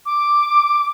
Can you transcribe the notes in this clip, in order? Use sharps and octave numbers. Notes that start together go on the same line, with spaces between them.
D6